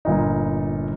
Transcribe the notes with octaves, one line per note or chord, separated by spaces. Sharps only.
G1 A#2 D#4